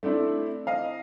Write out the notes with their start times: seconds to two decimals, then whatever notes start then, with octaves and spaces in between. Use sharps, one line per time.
0.03 A3 C4 D4 E4
0.67 D#5 F5